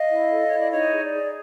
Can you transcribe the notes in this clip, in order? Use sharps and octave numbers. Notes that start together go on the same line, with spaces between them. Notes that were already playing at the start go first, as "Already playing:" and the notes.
Already playing: D#5 F5
E4
A4
E4 C#5
D5
D#4 C#5 D#5
G#4
D5
G#4